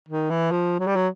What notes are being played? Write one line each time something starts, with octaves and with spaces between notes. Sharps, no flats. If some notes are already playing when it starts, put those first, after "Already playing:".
D#3
E3
F3
F#3
G3
F#3